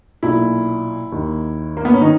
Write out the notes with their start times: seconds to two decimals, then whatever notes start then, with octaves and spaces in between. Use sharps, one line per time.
0.23 B1 A#2 E4
1.12 D#2 D#3
1.77 A#3
1.85 B3
1.93 C#4
2.01 D#3 D#4